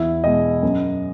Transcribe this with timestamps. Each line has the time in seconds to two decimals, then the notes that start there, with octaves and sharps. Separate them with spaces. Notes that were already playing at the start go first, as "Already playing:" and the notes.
Already playing: E2 E4
0.24 B2 G#3 D#5
0.63 F#2